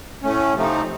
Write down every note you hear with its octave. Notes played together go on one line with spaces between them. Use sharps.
A2 A3 C#4
C3 F3 A3 C4 D#4